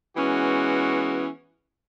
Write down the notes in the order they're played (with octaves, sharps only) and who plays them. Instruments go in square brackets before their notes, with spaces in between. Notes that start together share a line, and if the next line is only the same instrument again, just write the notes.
[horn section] E3 G#3 B3 C#4 F#4